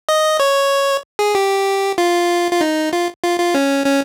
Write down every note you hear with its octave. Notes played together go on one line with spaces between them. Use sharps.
D#5
C#5
G#4
G4
F4
F4
D#4
F4
F4
F4
C#4
C#4